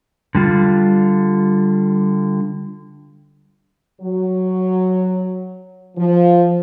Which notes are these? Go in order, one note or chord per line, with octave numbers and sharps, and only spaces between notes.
D3 G3 F4
F#3
F3